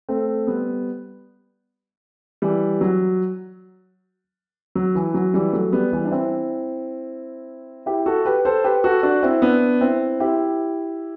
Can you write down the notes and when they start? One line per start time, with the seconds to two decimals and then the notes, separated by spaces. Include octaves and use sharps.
0.09 A3 C4
0.47 G3 B3
2.42 E3 G3
2.81 F#3
4.75 F#3
4.95 E3
5.14 F#3
5.34 E3 G3
5.53 F#3 A3
5.73 G3 B3
5.92 E3 G3
6.05 D4
6.11 C4 E4
7.86 E4 G4
8.06 F#4 A4
8.25 G4 B4
8.45 A4 C5
8.64 G4 B4
8.84 F#4 A4
9.03 D4 F#4
9.23 C4 E4
9.42 B3 D4
9.81 C4 E4
10.20 E4 G4